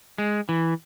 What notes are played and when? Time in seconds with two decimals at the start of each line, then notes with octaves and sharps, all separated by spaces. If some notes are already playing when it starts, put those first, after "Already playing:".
0.18 G#3
0.49 E3